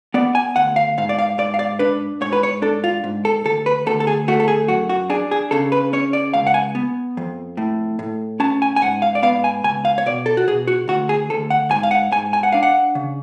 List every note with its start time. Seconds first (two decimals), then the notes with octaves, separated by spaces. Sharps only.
0.14 B3 D5
0.35 G#5
0.56 D2 F#5
0.76 F5
0.98 G#2 F5
1.09 D5
1.19 F5
1.38 G#2 D5
1.54 F5
1.59 D5
1.79 D4 B4
2.21 G#2 C#5
2.33 B4
2.43 C#5
2.62 D4 A4
2.84 F4
3.04 G#2
3.25 A4
3.45 D2 A4
3.66 B4
3.86 D2 A4
4.00 A4
4.07 G#4
4.28 A3 F#4
4.40 A4
4.48 G#4
4.68 F#2 F#4
4.89 F#4
5.10 D4 G#4
5.31 G#4
5.51 C#3 A4
5.72 B4
5.93 C#4 C#5
6.13 D5
6.34 C#2 F5
6.47 F#5
6.54 G#5
6.75 B3
7.17 F2
7.57 A2
7.99 A2
8.40 C#4 A5
8.62 G#5
8.76 G#5
8.82 G#2 F#5
9.02 F5
9.15 D5
9.23 B3 F5
9.44 G#5
9.64 C#2 G#5
9.85 F5
9.98 C#5
10.06 B2 D5
10.26 A4
10.37 F#4
10.47 B2 G#4
10.67 F#4
10.88 D2 F#4
11.09 G#4
11.30 D2 A4
11.50 F#5
11.71 G#2 G#5
11.83 F5
11.91 F#5
12.12 G#2 G#5
12.33 G#5
12.43 F#5
12.52 D4 F5
12.63 F#5
12.95 C#3